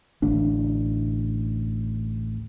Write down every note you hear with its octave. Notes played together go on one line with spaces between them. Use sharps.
A1 D2 D4